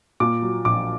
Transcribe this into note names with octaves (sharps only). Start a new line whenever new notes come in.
A#2 D6
F#3
A#1 D6